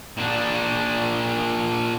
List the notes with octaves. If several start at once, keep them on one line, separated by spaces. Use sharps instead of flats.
A#2 D4